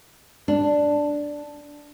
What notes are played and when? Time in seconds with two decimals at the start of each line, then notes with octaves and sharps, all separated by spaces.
0.48 D4